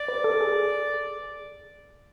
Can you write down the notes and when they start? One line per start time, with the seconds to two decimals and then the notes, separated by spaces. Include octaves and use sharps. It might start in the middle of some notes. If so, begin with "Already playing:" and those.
Already playing: D5
0.08 B4
0.24 A4
0.41 G#4